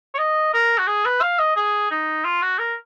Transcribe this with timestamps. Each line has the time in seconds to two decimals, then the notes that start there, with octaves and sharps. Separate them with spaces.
0.15 C#5
0.18 D#5
0.54 A#4
0.79 F#4
0.87 G#4
1.05 B4
1.22 F5
1.39 D#5
1.56 G#4
1.91 D#4
2.25 F4
2.42 F#4
2.59 A#4